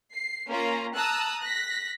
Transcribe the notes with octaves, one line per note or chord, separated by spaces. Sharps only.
C7
A#3 C#4 F4 A#5
A5 A#5 D#6 E6 F#6
F#6 A#6 B6